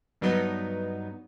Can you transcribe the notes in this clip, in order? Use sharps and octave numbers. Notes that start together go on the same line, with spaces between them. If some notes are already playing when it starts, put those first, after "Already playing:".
G2 F#3 B3 D#4